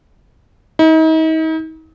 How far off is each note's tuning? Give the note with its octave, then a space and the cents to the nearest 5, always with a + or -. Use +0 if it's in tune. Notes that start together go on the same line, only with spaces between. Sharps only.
D#4 +40